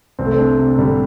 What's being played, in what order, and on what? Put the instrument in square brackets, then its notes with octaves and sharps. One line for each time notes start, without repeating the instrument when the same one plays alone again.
[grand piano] C2 [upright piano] C4
[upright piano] A3
C4
[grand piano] D4
C3
[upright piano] D3 [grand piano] G3